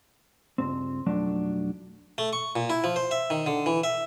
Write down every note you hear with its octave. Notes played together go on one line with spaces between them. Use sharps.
C#2 G2 C4
B1 F2 F#3 A3 D4
A3
C#6
A#2
E4
F3
C5
E5
D#3
D3
E3
E5